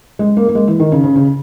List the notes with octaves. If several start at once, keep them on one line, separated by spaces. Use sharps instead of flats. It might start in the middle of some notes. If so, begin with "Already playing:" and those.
G#3
A#3
A#3
G#3
E3
D#3
C#3
C#3
C#3